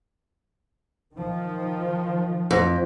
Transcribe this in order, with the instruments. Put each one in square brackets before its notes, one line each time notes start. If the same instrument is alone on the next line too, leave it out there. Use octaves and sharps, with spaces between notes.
[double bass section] D#3 F3
[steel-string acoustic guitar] F2